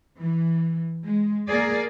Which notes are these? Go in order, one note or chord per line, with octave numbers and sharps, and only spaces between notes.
E3
G#3
A#3 G#4 A#4 D5